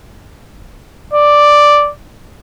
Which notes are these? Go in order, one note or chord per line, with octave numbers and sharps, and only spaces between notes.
D5